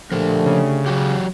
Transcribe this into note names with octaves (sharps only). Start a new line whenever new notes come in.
D3 F3 A3 G4 A#4
C#3
F#3 F#4 G4